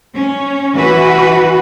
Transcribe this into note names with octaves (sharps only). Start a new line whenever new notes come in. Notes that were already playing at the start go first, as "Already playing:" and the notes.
C#4
E3 F#4 B4